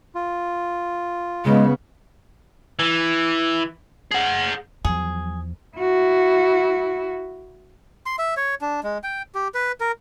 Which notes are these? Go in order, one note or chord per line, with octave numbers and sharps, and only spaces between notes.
F4
C#3 G#3 B3
E3
G#4 F#5
E2 F3 F#3 G#4
E4 F#4
C6
E5
C#5
D4
G#3
G5
G4
B4
A#4